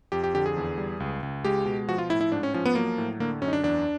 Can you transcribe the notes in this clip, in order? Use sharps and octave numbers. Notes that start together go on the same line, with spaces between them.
F2 G4
G4
D3 G4
G#4
E2
G3
C#2
C#2
G#3 G4
B2
F3 F#4
F4
A2 E4
E4
G#2 D4
C#4
F3 C#4
B3
F#3 A#3
A2
D3 A#3
F#2 C#4
D#4
D4
E2 D4